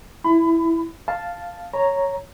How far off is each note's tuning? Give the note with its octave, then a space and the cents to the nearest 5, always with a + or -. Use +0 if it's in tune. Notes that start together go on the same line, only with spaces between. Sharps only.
E4 +0 B5 +30
F5 +0 A5 +0
C#5 +0 A#5 +0